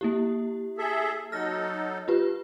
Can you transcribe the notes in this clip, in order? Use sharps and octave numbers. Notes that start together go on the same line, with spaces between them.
A#3 E4 G4
G#4 A4 E5
F#3 D#4 A4 F6 A#6
F4 G4 B4